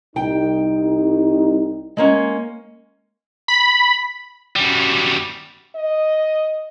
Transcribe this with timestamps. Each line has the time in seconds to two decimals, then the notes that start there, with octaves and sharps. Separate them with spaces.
0.16 C2 D#4 G5
1.97 G#3 A#3 C#4
3.48 B5
4.56 F#2 G3
5.75 D#5